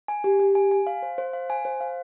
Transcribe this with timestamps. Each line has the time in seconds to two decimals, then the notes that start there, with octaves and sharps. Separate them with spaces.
0.08 G#5
0.24 G4
0.40 G4
0.55 G#5
0.71 G#5
0.87 F5
1.02 C5
1.18 C5
1.33 F5
1.50 G#5
1.65 C5
1.81 F5